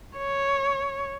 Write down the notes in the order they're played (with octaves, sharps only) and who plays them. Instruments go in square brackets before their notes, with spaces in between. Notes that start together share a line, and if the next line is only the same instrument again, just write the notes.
[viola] C#5